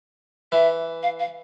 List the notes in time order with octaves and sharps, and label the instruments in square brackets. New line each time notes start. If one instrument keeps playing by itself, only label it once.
[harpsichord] E3 [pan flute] E5
[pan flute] F5
F5